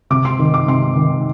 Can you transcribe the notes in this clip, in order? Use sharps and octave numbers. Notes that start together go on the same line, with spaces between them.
C3 D6
C6
D#3
D6
C3 C6
D#3